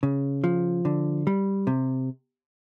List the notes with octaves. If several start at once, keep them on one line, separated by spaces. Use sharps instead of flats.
C#3
F3
D3
G3
C3